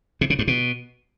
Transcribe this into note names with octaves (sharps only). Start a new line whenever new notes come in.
C3
C#3
G2
B2